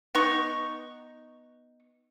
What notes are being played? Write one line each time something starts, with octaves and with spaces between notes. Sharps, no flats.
B3 D#4 C#6